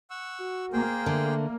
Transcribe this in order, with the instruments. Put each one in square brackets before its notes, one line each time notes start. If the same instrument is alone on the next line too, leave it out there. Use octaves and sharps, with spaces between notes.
[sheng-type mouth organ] F#5 C#6 E6
[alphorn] F#4
[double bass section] A#3 [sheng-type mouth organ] G#4 C5 G5
[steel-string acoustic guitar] D3 [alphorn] A3